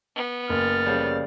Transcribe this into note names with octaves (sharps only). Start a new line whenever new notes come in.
B3
F#1 F6 A6
C#3 F3 G3